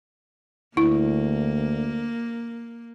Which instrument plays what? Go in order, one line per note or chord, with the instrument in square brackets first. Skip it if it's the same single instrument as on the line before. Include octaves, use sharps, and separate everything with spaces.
[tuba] D2 [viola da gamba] A#3 [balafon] E4